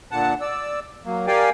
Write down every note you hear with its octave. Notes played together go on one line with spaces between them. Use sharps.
A#2 D3 F#5 A5
D5 E6
F#3 A#3
G4 A#4 D5 F5 G5 G#5